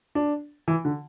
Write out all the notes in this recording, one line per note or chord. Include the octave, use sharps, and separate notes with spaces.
D4
E3
D3